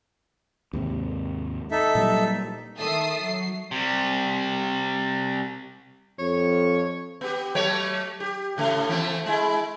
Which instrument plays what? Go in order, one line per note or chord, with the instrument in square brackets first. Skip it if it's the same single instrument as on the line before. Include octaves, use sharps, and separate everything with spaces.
[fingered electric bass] D#2 G#2 C3
[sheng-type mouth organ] D#4 A4 E5
[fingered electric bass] A#2 F#3 G3
[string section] D#3 A4 E5 D#6 C7
F#3 C7
[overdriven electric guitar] C3 G3
[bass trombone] F2 [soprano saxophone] C#5
[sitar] B3 G4
F#3 A3 C#5
G4
A2 C#3 A3
E3 A3 C4
G#3 E4